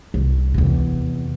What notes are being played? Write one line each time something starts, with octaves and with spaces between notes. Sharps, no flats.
C2
E2 C3